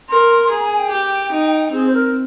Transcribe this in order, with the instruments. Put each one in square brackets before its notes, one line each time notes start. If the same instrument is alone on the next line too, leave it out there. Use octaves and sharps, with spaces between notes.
[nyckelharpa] A#4 [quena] C6
[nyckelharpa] G#4 [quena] A#5
[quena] G#5
G5
[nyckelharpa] G4
D#4
[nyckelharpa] C4 [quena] G#4
[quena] C5
A#4